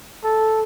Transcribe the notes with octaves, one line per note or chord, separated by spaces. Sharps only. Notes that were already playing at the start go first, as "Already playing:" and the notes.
A4